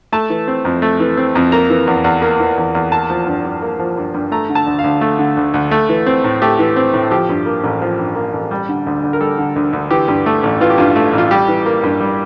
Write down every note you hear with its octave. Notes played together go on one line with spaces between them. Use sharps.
A3 A5
E3
C4
F2
A3
E3
C4
F2
A#3 A#5
E3
E2
E2
A#3
E3
E2
E2
A#3 A5
F3
G2
G2
A#3
F3
G2
G2
A3 A#5
D3
A5
D2
F5
D2
A3
D3
D2
D2
A3
E3
C4
A2
A3 G4
E3
C4
A2
F3 G4
G2
A#3
A1
F3
G2
A#3
A1
G3
D3
D2
D2
A#4
G3 A4
D3
D2
D2
E3 G4
G2
A3
A1
E3 F4
G4
G2 F4
A3
A1
F4
G3 G4
E3
A#3
G2
G3